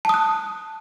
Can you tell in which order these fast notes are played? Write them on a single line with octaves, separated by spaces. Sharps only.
A5 D#6 F#6